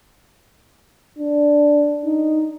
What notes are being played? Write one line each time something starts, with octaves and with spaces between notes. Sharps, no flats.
D4
D#4